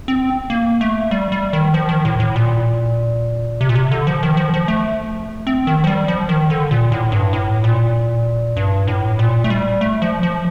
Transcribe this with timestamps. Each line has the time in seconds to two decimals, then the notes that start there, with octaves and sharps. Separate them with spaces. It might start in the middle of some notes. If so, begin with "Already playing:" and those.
0.08 C4
0.50 A#3
0.81 A3
1.11 G3
1.32 G3
1.53 D#3
1.74 F3
1.89 D#3
2.05 A2
2.20 A2
2.36 A#2
3.61 C3
3.69 A#2
3.75 C3
3.91 D3
4.07 F3
4.23 D#3
4.37 F3
4.54 F3
4.68 A3
5.47 C4
5.67 D#3
5.84 F3
5.87 G3
6.08 F3
6.29 D#3
6.50 D3
6.71 A#2
6.92 A2
7.12 G2
7.33 A2
7.64 A#2
8.57 G2
8.87 A2
9.19 A#2
9.44 A3
9.50 G3
9.81 A3
10.02 F3
10.23 F3